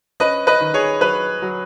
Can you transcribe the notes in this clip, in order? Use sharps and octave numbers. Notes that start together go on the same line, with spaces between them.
C#4 B4 D#5
B4 D#5
D#3
G#4 C#5
F#3 B4
F#3